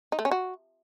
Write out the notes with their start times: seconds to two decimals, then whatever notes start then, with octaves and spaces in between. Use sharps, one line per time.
0.12 D#4
0.19 A3
0.25 C#4
0.31 F#4